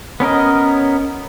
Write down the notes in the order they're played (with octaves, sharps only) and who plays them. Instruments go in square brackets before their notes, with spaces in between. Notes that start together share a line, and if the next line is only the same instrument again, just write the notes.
[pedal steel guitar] B3 C#4 A#4 D#5